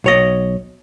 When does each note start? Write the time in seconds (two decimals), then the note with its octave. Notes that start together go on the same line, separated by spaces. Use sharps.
0.04 B1 C#5 D#5